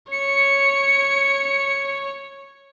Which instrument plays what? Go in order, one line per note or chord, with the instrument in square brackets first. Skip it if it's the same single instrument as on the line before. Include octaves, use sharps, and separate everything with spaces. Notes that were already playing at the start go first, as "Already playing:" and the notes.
[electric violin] C#5 [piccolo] C#7